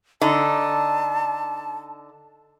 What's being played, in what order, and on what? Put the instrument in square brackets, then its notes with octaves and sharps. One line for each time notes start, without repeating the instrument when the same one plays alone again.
[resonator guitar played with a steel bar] D3 D#4 [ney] A5